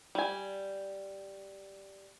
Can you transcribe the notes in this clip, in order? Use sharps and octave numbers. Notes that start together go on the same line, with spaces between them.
G3 G#5